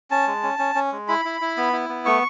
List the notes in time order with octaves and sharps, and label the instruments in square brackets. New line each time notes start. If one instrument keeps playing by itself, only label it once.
[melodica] C#4 A5
G#3
C#4
C#4
C#4
G#3
E4 B5
E4
E4
B3
E4
B3
A3 C#6